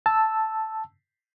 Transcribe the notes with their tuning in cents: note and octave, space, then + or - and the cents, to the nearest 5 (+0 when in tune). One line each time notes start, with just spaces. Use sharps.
A5 +0 E6 +0